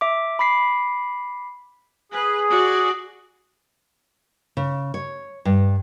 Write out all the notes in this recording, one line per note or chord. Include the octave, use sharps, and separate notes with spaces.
E5 D6
B5 D6 B6 C7
G#4 B4
F#4 D5
C#3
C#5
G2